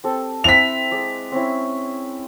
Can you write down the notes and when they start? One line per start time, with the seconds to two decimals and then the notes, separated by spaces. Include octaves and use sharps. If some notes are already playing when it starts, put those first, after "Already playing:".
0.04 C4 G4 A4
0.44 C4 E4 B6 F7
0.91 G#3 D5 D#5
1.32 C4 C#4 E4